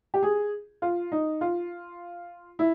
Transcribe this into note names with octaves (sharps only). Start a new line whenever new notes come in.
G4
G#4
F4
D#4
F4
E4